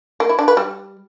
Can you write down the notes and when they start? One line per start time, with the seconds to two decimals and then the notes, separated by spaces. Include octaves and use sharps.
0.20 A#3
0.29 E4
0.39 D4
0.48 B4
0.57 G3